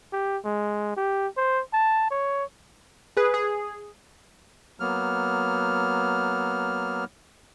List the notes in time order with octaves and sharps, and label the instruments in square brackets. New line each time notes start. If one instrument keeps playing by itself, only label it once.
[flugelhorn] G4
G#3
G4
C5
A5
C#5
[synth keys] G#4 B4
G#4
[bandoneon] F#3 A#3 B3 F6